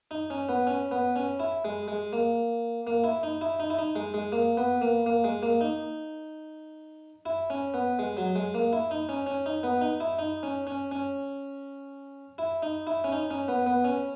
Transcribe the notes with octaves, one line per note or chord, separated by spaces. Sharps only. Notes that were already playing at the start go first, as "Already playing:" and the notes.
D#4
C#4
B3
C#4
B3
C#4
E4
G#3
G#3
A#3
A#3
E4
D#4
E4
D#4
E4
D#4
G#3
G#3
A#3
B3
A#3
A#3
G#3
A#3
D#4
E4
C#4
B3
G#3
F#3
G#3
A#3
E4
D#4
C#4
C#4
D#4
B3
D#4
E4
D#4
C#4
C#4
C#4
E4
D#4
E4
C#4
D#4
C#4
B3
B3
C#4